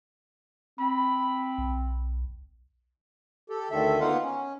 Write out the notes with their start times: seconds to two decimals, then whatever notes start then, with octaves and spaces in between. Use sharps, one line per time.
0.79 C4 B5
1.58 B1
3.50 G4 A4
3.71 D2 D3 D#3 A4 E5
4.00 A#3 B3 D#4 F4 F5 F#5
4.23 C#4